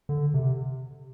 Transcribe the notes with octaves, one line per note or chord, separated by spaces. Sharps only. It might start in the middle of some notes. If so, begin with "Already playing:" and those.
D3
C3